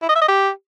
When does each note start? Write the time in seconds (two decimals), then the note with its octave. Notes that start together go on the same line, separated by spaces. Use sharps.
0.03 E4
0.09 D#5
0.15 E5
0.22 D#5
0.28 G4